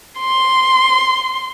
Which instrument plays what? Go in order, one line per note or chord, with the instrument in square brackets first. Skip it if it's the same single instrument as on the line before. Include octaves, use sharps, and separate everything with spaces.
[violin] C6